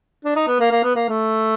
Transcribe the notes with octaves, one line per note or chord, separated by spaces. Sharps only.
D4
D#4
B3
A#3
A#3
B3
A#3
A3